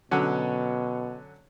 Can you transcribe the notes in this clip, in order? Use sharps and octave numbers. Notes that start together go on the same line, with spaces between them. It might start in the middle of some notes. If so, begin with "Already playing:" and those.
B2 D3 F#3 C#4